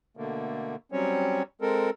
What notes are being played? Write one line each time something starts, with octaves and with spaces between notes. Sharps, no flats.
B2 D3 A3 A#3
F#3 G3 C4 C#4 C#5
G#3 C4 A4 A#4